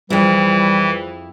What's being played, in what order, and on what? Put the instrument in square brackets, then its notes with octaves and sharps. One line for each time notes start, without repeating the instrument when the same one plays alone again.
[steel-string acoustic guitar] F2 E4 [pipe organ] E3 [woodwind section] G3 [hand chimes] F4 G#4 C5